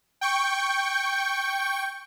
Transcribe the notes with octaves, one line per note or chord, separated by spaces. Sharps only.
G5 C#6